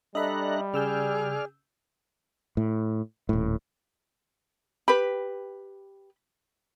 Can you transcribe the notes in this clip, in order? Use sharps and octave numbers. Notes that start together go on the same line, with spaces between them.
G3 D4 A4 D#5 E5 A#5 B5 F#6
C#3 G#4 D5 E6 F6 G6
A2
D#1 A2
G4 B4 B5